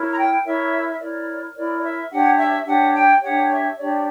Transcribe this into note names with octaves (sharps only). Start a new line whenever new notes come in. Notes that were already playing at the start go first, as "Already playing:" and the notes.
Already playing: E4 A#4 C#5
A#5
G5
E4 A#4 C#5 E5
E5
E4 A#4 C#5 D5
E4 A#4 C#5 D5
D5
E5
D4 G4 C#5 F#5
E5
D4 G4 C#5 F#5
G5
D4 G4 C#5 F#5
E5
D4 G4 C#5 D5